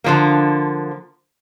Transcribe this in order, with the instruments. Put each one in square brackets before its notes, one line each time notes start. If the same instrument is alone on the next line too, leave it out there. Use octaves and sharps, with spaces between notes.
[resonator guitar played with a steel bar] D3 F3 A#3